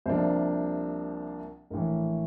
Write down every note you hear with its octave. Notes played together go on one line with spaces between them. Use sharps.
C2 C3 F3 A#3 D4 C5
A#1 A2 E3 A#4